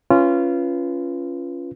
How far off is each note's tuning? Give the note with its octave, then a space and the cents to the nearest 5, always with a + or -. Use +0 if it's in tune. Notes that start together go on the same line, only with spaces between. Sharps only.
C#4 +0 F4 -20 B4 +0